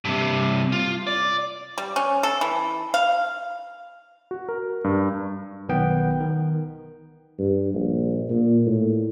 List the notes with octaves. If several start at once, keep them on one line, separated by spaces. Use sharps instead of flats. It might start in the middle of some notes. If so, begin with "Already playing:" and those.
G2 C3
F4
D5
G3
C#4
A4
E3
F5
F#4
A#4
G2
B1 D#3 B3 G5
D#3
G2
A#1
A#2
A2